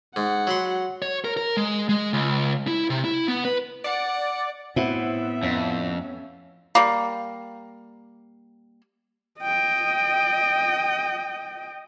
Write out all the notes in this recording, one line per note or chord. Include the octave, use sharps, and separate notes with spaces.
G#2 F#5
F#3 B5 C6
C#5
A#4
A#4
G#3
G#3
C#2
E4
C3
E4
B3
B4
D5 F#5
A2 B3 C4 E4 E5 F#5
F2 C#4
G3 A#3
D#5 G5